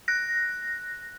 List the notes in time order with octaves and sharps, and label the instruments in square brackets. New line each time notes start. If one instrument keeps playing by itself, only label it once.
[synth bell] F#6 A#6